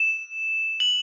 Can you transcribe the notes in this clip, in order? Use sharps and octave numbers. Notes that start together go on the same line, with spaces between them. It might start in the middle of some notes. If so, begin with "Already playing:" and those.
Already playing: E7
F#7